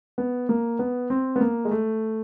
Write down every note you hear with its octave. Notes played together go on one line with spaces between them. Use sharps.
B3
A#3
B3
C4
B3
A#3
G#3
A3